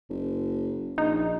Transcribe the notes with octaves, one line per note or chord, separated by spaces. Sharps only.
F#1
A#1 D#4